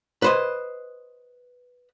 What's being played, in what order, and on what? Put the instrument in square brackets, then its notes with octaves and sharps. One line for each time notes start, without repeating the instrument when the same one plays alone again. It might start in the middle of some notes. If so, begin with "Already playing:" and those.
[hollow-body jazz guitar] B4 C5 D#5